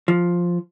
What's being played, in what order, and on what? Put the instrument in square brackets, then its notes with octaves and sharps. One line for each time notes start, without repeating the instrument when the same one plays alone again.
[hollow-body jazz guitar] F3